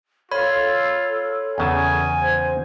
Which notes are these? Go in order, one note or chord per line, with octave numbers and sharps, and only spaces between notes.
F4 A4 C#5 B5
E2 C#3 G#5 A5
C5